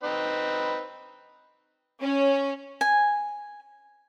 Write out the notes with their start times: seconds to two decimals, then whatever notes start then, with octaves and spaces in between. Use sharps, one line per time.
0.03 C4 D#4 B4
2.01 C#4
2.81 G#5